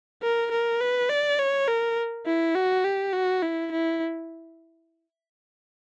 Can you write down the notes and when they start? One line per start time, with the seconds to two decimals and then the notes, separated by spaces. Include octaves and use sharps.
0.22 A#4
0.52 A#4
0.81 B4
1.10 D5
1.39 C#5
1.68 A#4
2.26 E4
2.55 F#4
2.84 G4
3.13 F#4
3.42 E4
3.72 E4